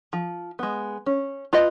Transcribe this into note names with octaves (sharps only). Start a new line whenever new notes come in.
F3
G#3 B3
C#4
F4 B4 D#5